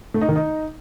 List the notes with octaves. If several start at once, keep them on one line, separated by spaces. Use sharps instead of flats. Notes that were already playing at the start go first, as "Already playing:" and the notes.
A3
D#4
D#3
D#4